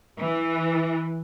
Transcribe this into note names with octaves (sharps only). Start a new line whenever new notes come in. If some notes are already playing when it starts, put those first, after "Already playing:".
E3